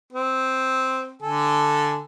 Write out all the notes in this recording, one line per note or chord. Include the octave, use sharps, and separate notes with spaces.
C4
D3 A4 G#5